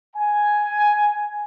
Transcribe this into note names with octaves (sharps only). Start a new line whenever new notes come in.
G#5